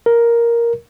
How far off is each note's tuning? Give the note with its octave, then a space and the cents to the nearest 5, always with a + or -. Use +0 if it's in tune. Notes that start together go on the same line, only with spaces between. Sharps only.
A#4 +5